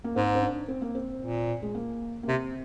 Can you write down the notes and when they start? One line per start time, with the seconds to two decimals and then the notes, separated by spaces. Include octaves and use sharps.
0.04 A#3
0.15 G#2 C4
0.35 C4
0.42 D4
0.68 C4
0.82 A#3
0.95 C4
1.22 A#2
1.62 G#3
1.75 A#3
2.23 A#3
2.28 C3 C4